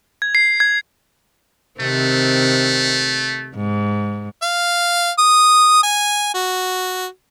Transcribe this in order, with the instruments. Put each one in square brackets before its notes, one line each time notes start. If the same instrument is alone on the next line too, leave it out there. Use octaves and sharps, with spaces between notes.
[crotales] G#6
C7
G#6
[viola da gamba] C3 D#3 C4 [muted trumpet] A3
[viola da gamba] G#2
[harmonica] F5
D#6
G#5
F#4